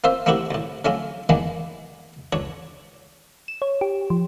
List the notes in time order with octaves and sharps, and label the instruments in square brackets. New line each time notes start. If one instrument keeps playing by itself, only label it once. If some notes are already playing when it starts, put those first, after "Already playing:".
[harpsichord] A#3 C4 F4 C5 E5
A3 A#3 C4 E4 F#4 G4
D2 A2
D3 F#3 A3 C#4 D4 F4
D#3 E3 G#3 A#3 B3 D4
C#2 D4 C#5
[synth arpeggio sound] E7
C#5
G4
F3